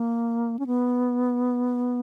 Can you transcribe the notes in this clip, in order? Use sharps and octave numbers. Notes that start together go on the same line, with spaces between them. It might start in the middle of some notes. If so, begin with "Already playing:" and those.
Already playing: A#3
C#4
B3